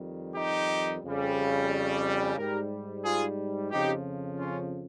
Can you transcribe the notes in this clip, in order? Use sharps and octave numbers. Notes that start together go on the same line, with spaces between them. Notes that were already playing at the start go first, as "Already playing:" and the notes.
Already playing: F2 D#3 G3
D#4 G4
F2 C#3 G3
G#2 G3 G4 A#4
F4 G#4
F2 C#3 F3 D#4 G4
C#4 F4